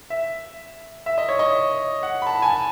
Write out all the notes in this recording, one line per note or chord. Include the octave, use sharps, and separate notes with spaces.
E5
E5
D#5
C#5
D#5
F#5
B5
A5
G#5
A5